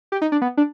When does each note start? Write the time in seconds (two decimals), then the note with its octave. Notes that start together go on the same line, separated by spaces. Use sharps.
0.12 G4
0.22 D#4
0.32 D4
0.42 B3
0.57 D4